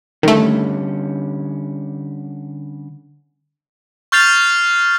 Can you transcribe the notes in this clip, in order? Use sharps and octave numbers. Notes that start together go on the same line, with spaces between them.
D3 D#3 G3 A3 C#4
C#6 F6 G6 A6 C7 F7